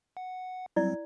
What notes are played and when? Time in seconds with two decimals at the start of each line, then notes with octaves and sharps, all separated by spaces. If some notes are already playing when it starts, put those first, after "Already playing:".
0.17 F#5
0.76 F#3 G3 C4 E4 D5